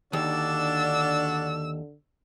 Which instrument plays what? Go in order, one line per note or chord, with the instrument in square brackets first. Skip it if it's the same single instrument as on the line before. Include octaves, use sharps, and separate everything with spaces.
[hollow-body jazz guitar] D#2 [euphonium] D3 [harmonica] D4 F#4 D5 [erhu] E6